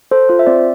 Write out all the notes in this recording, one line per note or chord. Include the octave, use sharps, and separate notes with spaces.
A4 C5
F4 C5
E5
C4 D5